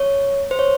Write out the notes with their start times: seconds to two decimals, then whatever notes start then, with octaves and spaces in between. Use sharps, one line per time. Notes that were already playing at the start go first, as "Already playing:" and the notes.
Already playing: C#5
0.51 C5
0.59 C#5